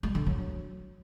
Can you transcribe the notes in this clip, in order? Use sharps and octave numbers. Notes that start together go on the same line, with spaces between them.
G3
D3
F#3